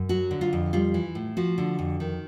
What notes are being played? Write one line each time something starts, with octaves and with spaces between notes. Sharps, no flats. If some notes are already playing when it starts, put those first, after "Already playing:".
Already playing: F#2
F#3 F#4
D3
F4
F2
G3 F4
E3
A2
F3 F#4
D3
F2
D#3